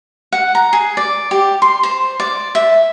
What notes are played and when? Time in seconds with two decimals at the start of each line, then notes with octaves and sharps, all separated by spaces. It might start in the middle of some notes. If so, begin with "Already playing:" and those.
0.32 F#5
0.55 A#5
0.73 G#4
0.97 D5
1.31 G4
1.62 C6
1.83 C5
2.20 D5
2.55 E5